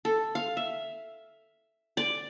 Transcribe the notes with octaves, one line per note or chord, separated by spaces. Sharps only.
A4
F5
E5
D5